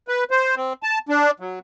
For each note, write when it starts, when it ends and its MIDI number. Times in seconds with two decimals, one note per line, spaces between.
0.08 0.24 71
0.31 0.55 72
0.56 0.73 60
0.83 0.99 81
1.09 1.31 62
1.40 1.59 54